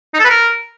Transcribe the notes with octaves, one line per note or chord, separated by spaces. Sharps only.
D#4
A4
B4
A#4